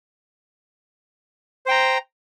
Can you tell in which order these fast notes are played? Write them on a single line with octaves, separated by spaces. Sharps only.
C5 G5 A#5